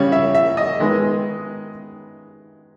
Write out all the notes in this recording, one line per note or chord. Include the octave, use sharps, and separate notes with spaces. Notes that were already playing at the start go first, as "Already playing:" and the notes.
Already playing: C#3 G3 C#4 C#5
E5
E5
D#5
D#3 G#3 B3